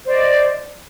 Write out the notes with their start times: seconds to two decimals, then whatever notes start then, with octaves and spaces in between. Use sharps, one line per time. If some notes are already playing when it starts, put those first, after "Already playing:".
0.04 C5
0.07 D5
0.11 D#5